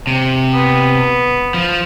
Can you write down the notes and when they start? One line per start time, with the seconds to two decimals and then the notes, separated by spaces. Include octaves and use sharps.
0.07 C3
0.54 B3
1.54 F3